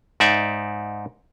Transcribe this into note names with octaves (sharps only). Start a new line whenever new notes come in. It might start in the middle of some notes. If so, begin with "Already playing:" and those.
G#2 D#4 D5 E5